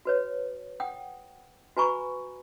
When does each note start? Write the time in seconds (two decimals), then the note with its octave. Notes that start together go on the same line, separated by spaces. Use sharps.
0.05 F#4 B4 C#5
0.80 F#5 G5 D#6
1.77 F#4 B4 G#5 A#5 B5 C#6